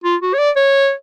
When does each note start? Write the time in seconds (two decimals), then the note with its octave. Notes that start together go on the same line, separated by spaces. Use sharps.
0.04 F4
0.22 F#4
0.34 C#5
0.38 D5
0.56 C#5